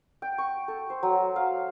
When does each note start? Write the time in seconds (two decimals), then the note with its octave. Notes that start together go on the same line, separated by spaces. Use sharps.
0.22 G5
0.38 C#6
0.68 A4
0.90 C5
1.03 F#3
1.36 F5